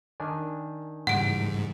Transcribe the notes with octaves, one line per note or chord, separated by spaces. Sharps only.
D#3 D4 G#5
G#2 C#3 E3 G3 F#5 D7